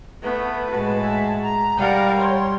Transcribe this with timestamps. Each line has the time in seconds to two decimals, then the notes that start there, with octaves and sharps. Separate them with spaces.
0.22 A3 B3 B4
0.70 A2 G#3 F#4 A5
1.01 G#4 E5
1.42 A#5
1.78 G3 A#4 D5 F5 F#5
2.19 C#5 C6